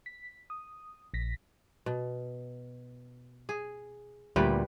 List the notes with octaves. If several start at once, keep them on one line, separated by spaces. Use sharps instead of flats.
B6
D#6
A#1 A#6 B6
B2
G#4
D2 A#2 G3 B4 G5